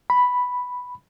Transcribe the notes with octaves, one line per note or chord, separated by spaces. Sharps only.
B5